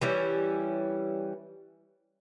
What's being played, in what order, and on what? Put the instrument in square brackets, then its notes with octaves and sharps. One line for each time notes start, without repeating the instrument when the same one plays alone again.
[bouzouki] E3 G3 C#4